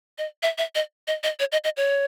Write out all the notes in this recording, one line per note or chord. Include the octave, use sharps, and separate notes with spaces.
D#5
E5
E5
D#5
D#5
D#5
C#5
D#5
D#5
C#5